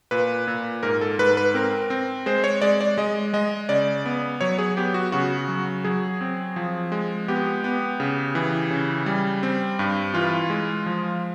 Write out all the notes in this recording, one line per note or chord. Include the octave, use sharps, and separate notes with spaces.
A#2 B4
A#2
G#2 A#4
A4
G#2 B4
B4
C4 A#4
C4
G#3 C5
C#5
G#3 D5
D5
G#3 D#5
G#3 D#5
C#3 D5
B3
F#3 C#5
G#4
B3 G4
F#4
C#3 F#4
F#3
F#3 G#4
C4
F3
G#3
B3 G4
B3
C#3
E3
C#3
G3
C4
G2
E3 F4
G#3
F3